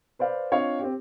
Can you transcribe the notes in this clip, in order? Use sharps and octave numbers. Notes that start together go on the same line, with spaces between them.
B4 C5 D5 F5
C4 D4 F4 C#5 D#5 F5
C4 G4